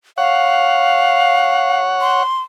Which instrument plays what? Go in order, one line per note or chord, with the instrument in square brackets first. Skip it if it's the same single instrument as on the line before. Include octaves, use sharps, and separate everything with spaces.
[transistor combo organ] C#5 F#5 [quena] F5
[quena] C6